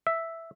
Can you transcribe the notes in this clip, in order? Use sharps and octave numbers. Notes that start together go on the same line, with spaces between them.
E5